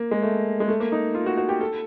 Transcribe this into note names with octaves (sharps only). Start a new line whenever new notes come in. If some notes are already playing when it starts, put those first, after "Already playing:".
Already playing: A#3
G#3
A3
G#3
A3
A#3
D#4
F4
F#4
F#4
G4
A4